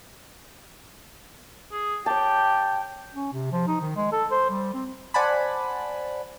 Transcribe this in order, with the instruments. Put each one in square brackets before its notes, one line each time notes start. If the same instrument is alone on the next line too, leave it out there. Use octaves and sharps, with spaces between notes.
[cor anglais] G#4
[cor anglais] G4 [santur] C#5 A5 [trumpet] G5
[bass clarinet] C#4
C3
F3
D#4
D#3
G#3
A4
C5
G3
C4
[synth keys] C5 D5 F#5 G#5 A5 B5